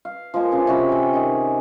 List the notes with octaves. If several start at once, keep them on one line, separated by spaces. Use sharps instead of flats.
F5
F3 G#3 A#3 G#4
C#3 D4 G#4
C3 C#4 F#4 B5
G4 A4
D#3 G#4